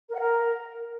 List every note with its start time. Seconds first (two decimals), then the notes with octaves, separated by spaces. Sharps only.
0.09 A#4
0.14 F#5
0.19 A#4